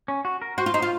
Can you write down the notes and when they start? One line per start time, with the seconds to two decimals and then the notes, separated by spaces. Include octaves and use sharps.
0.08 C#4
0.25 F#4
0.42 A#4
0.58 F#4 C5
0.66 F4
0.74 D#4 C5
0.82 F4